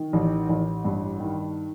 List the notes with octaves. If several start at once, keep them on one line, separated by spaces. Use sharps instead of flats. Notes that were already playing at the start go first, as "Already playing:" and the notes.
Already playing: D#3
A1
A1
G2
D#3